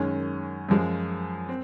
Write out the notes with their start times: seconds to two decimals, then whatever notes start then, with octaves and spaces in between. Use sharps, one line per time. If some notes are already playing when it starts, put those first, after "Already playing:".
Already playing: F#2 D#3 G#3 C#4
0.69 F#2 F3 G#3
1.49 C4